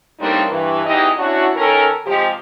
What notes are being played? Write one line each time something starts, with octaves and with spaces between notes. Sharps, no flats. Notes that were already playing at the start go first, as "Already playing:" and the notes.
A2 G3 A#3 C4 D4 D#4
G2 E3
E2 E3 D#4 G4 D#5
C#4 D4 E4 F#4
D#3 C#4 A4 A#4
C3 F3 G#3 C4 G4